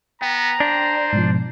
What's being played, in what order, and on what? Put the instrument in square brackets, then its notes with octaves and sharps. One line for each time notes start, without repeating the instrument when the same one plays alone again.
[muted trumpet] B3 [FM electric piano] G5 A#6 [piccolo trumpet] A#5
[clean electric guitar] D4 [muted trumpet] C5
[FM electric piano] G#2 B2 F3